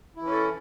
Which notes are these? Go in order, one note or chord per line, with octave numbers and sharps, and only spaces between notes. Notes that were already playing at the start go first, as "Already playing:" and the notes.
E3 C#4 E4 A4